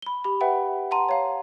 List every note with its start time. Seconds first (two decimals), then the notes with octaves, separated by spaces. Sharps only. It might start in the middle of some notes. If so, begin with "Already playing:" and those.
0.02 B5 G7
0.24 G4 B5
0.41 B4 E5 F#5 G5
0.91 F#5 A5 A#5 C6 D#7
1.09 C#5 F5 A#5